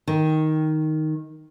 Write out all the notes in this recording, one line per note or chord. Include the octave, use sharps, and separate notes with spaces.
D#3